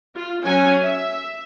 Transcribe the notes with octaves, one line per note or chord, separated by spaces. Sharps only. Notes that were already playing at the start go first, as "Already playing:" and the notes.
F4
F#3 C#4 G#5
E5